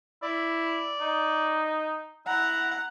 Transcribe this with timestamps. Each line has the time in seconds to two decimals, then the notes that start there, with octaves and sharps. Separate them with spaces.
0.23 E4 D5
1.01 D#4
2.27 E4 F#5 A#5